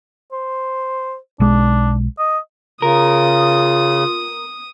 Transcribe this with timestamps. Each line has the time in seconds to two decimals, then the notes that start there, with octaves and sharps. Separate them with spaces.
0.32 C5
1.40 B1 G#3 D4
2.19 D#5
2.82 C#3 F4 A#4 D#6